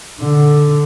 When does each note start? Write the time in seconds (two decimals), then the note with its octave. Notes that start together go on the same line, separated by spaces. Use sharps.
0.21 D3